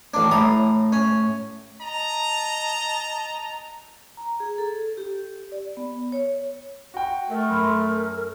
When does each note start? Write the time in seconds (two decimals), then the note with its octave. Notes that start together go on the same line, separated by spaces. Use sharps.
0.14 A1 D4
0.31 A2 A#5 D#6
0.92 C#4
1.82 D#5 A5 A#5
4.17 A#5
4.40 G#4
4.58 A4
4.97 G4
5.52 D5
5.77 B3
6.12 C#5
6.94 F#4 G5
7.29 A3 A#4
7.50 F#2 B5 C6
7.68 A4